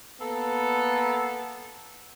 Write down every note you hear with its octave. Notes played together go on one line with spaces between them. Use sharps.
A#3 B3 A4